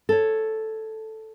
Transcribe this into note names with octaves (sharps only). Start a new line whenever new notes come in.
A4 C#5